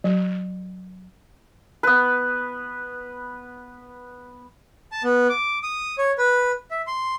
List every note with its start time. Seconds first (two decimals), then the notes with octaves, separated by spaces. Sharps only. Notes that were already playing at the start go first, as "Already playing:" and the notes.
0.04 F#3
1.83 B3 B4
4.92 A5
5.04 B3
5.29 D6
5.63 D#6
5.98 C#5
6.18 B4
6.71 E5
6.87 C6